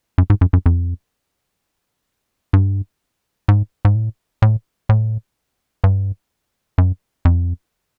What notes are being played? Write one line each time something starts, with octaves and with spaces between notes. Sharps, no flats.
F#2
G#2
F#2
F#2
F2
G2
G#2
G#2
A2
A2
A2
G2
F#2
F2